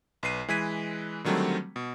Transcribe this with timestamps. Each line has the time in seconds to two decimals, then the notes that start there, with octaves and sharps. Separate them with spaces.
0.23 B1 B4 C7 D#7
0.48 E3 G#3 B4 G#6 B6 D#7
1.24 D3 D#3 F#3 G3 A3 C4
1.76 B2